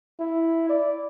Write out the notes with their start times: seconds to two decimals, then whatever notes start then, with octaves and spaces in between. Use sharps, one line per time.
0.20 E4
0.69 D5